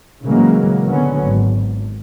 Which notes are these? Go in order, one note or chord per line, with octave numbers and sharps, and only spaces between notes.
A#2 C#3 E3 F#3 G#3 A#3
D3 F#3 B3 C#4
G#1